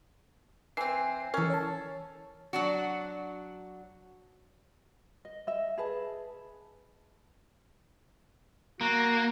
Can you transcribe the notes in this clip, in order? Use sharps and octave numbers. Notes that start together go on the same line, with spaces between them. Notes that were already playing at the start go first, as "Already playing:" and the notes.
E3 C4 G#5 C7
E3 C#4 A4 A#4
C#5 A5
F#3 D4 F#4
D#5
D#5 E5
G#4 B4 A5
A#3 F#4